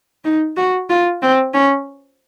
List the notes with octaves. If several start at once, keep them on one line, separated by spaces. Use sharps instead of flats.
D#4
F#4
F4
C4
C#4